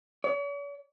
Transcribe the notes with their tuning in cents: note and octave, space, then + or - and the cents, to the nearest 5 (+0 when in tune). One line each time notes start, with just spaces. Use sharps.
C#5 +45